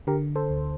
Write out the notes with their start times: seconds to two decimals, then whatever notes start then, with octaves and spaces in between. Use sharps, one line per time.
0.07 D3 G4 A#4
0.36 A4 C5
0.50 D2